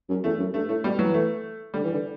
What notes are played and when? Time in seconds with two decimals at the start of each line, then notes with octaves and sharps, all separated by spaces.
0.10 F#2
0.24 E2 A3
0.39 F#2
0.54 G2 A3
0.69 A2 A3
0.84 B2 G3
0.99 E3 F#3
1.14 A3
1.74 D3 G3
1.84 E3
1.93 D3